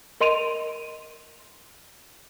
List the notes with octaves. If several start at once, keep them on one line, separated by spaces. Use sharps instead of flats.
A#4 D#5 C6 D7 D#7 F7